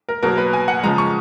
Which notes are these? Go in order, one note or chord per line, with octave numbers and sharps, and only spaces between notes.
A#4
B2 F#3 A#3 A#4
B4
G#5
F#5
C#3 F3 G#3 A#5
C#6